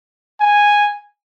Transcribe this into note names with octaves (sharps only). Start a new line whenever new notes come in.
G#5